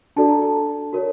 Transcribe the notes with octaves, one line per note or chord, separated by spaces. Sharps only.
D4 F#4 A4 D5 A5
A#5
A5
F#4 A#4 C#5